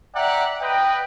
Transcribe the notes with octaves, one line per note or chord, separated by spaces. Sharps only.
D5 E5 F#5 G5 A#5
B4 D#5 G5